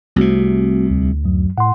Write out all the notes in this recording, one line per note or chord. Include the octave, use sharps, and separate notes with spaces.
C2 C3 A3 C4 F#4
D2
F#2 F#3
A2 F#5 C6